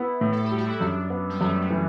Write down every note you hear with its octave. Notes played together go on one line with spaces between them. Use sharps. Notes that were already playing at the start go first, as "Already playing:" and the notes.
Already playing: B3 E4
A2
A4
G4
G3
F#4
E4
F#2 D4
B3
G3
F#2 A3
F#3
E3